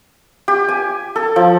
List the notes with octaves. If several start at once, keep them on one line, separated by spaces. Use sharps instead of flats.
G4
G#5
A4
F3